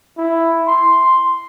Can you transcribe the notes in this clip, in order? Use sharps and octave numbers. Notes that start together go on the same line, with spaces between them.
E4
C6